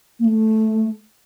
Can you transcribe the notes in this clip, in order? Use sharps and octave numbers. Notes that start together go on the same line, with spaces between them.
A#3
A3